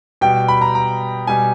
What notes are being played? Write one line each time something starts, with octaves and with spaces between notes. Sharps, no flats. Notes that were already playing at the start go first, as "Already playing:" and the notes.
B2 G3 G5
B5
A#5
A#5
B2 G3 G#5